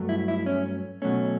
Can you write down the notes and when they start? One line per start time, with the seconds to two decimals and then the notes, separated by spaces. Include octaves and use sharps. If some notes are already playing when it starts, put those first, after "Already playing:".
Already playing: G2 F#3 A3
0.09 E4
0.28 E4
0.46 C#4
1.02 B2 F#3 A3 C#4